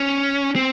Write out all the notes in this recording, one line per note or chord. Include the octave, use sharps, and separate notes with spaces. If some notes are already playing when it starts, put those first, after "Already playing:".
Already playing: C#4
C4